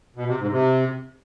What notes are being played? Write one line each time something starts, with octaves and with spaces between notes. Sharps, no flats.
B2
C3
G#2
C3